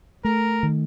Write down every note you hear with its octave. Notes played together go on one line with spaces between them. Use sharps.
A3 A#4
D#3